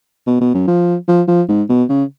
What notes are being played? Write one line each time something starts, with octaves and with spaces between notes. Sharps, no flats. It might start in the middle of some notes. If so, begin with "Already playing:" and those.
B2
B2
F#2
F3
F3
F3
G#2
B2
C#3